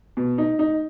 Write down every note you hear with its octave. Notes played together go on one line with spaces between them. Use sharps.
B2
D#4
D#4